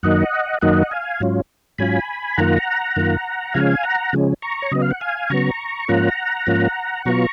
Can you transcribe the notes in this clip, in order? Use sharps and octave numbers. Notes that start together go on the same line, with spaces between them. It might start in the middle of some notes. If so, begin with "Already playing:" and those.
F#2 D#3 F#3 A#3 D#4 D#5 F#5
F#2 D#3 F#3 A#3 D#4 D#5 F#5
F5 G#5
G#2 F#3 C#4 F4
G#2 F#3 C#4 F4 G#5 B5
F#2 D#3 A#3 F4 F#5 A#5
F#2 D#3 A#3 F4
C#3 F3 G#3 C#4 F5 G#5
F#5 A#5
C#3 F3 G#3 C#4
A#5 C#6
C#5
C#3 F#3 B3 D#5
F5
F#5
F5 G#5
C#3 F#3 B3 A#5 C#6
G#2 F3 A#3 C#4 F4 F#5 A#5
G#2 F3 A#3 C#4 F4
B2 F#3 B3 F4 A#5 C#6